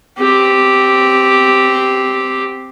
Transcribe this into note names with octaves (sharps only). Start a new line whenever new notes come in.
C4 G4